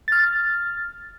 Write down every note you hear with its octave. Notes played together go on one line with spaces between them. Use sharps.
F6 A6